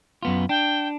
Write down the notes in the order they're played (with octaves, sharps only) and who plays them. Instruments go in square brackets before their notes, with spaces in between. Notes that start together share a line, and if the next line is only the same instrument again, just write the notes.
[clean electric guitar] F#2 B3 F4
[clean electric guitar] D4 [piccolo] G5